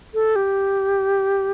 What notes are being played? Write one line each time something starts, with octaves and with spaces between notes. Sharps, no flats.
A4
G4